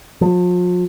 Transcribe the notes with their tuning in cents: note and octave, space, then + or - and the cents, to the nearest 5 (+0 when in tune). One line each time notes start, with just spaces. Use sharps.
F3 +40